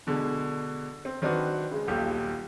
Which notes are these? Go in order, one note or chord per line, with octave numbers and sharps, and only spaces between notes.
B2 D3 G#3
C4
D#3 C4 D4 F#4 B4
C#3 G#3
D#1 B1 A#2 G4